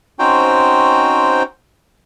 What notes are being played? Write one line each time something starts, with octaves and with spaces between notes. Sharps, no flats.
C4 C#4 D#4 F#4 C5 G5